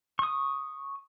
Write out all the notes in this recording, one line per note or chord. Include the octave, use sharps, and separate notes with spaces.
C#6 D#6